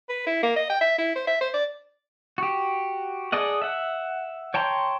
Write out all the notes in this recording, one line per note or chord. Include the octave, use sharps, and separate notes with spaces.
B4
E4
A#3
D#5
G5
E5
E4
C5
E5
C5
D5
F#4 G4
G#4 A4 D5 D#5 F#5
E5 F#5
C#5 G5 A5 A#5 C6